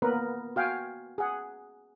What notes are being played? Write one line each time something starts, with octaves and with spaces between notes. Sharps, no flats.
A#3 B3 A#4 B4
F#4 F5 G5 G#5
G#4 F#5